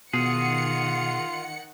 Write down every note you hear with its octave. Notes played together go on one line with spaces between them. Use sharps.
B2 D#3 F4 G#4 F#5 C#7